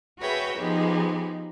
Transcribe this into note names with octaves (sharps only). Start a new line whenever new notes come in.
F#4 G#4 B4 C#5 E5 G5
F3 B3 D#4 G4 G#4